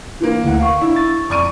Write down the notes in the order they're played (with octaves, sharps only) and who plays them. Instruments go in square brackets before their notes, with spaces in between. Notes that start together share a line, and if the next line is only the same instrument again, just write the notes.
[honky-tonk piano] E3 A#3
[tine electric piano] D2 E4 F#5
F5 C#6
[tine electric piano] D4 [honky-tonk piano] E4
[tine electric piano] C#6 A6
[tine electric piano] F2 F6 [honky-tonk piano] D5 C#6 D#7